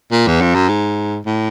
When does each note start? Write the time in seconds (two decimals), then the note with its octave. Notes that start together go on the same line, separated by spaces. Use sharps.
0.12 A#2
0.27 E2
0.42 F2
0.55 F#2
0.69 G#2
1.26 A2